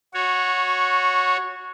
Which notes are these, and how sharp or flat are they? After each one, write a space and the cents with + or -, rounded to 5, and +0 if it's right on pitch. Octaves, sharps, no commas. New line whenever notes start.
F#4 -15 C#5 +0